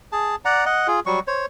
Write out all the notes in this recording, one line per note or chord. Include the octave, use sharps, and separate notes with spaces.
G#4 A5
D5 F#5 A#5
D#5 F#5
F4 G#4
F#3 G3 C#6
C5 C#5